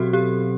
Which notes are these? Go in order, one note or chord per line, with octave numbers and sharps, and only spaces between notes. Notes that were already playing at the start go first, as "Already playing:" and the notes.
Already playing: B2 F#3 C4 F#4 G4 A4
G4